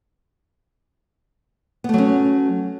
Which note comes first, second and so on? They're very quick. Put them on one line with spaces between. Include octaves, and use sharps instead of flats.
B3 A3 F#3 C#4